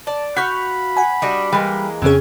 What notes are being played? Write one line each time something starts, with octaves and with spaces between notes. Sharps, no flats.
D5 A5
F#4 F5 B5 C#6 G6 B6
F#5 G#5
G3 D4 F#4 D#5
E3 G3 G#3 A#3
F2 C#3 C4 C#4 G#4